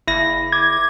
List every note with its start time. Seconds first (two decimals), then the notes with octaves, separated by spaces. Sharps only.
0.08 F#1 E4 A#6
0.52 D6 G#6